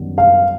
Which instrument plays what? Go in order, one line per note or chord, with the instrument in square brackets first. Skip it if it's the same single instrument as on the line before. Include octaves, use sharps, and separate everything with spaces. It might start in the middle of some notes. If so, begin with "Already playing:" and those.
Already playing: [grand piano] F#2 D#3 G3 B3
[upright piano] F5